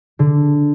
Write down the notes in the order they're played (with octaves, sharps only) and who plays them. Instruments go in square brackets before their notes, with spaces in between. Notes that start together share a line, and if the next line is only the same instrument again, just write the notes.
[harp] D3